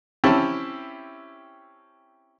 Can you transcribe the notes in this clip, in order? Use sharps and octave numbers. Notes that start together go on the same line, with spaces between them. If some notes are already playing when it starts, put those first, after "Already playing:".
C4 C#4 E4 G4 A5 B5